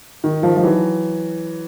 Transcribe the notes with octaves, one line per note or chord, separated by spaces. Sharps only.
D#3
D#3 F3
F3
E3 F#3